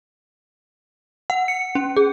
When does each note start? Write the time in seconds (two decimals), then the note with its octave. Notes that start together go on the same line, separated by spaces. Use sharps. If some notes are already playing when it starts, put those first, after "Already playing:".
1.30 F#5
1.48 C#7
1.75 C#4
1.97 G#4